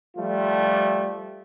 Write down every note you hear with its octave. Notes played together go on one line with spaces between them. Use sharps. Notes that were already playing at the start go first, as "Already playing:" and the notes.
F3 G3 A3 F4